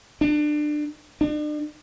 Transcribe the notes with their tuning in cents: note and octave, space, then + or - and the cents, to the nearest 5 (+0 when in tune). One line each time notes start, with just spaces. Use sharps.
D4 +25
D4 +40